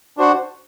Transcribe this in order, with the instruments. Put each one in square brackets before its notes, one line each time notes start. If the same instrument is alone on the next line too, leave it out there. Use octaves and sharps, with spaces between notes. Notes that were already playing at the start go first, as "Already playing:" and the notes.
[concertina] D4 F#4 C5 F#5